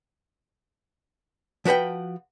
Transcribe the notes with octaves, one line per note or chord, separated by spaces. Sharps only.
F3 F#4 B4 F#5 G5